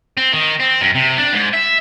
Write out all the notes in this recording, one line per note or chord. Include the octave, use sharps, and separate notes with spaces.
C4
D#3
C4
F#2
C3
D4
G#2
E5